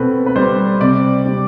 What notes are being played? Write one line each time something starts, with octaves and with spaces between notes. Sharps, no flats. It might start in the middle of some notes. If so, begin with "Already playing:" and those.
Already playing: B2 C4 A4 B4
B4
G3 C5
C3 D5
G3